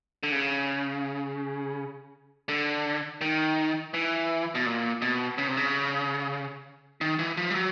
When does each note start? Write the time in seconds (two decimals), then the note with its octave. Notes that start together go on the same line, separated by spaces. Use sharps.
0.23 D3
0.32 C#3
2.49 D3
3.21 D#3
3.94 E3
4.55 B2
4.66 A#2
5.02 B2
5.38 C#3
5.48 C3
5.57 C#3
7.01 D#3
7.19 E3
7.37 F3
7.50 G3
7.55 F#3